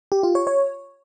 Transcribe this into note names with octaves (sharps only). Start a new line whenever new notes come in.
G4
F4
C#5
C#5